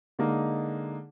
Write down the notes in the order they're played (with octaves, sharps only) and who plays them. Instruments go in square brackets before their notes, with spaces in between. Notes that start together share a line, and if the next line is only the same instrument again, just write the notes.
[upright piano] D3 G#3 A#3 D#4